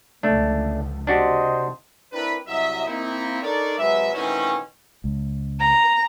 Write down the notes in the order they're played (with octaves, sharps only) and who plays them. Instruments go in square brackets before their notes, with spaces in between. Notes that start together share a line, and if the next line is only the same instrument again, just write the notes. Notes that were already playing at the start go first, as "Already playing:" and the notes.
[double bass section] C#2 D3 F3 [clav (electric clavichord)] A3 D4
[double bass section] C3 [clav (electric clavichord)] D4 F#4 G4 [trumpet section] C5 D#5
[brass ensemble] C4 D4 E4 A#4 B4
C2 F#3 D#5 E5
A#3 C4 D#4 E4
D4 D#4 A4 A#4 C#5 D5
C3 F#3 G#3 B4 E5
B2 D#3 E3 A3 C4 C#4
[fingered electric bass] C#2
[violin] A#5